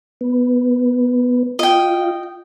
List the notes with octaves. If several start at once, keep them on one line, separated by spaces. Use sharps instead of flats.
B3
F4 D#5 G5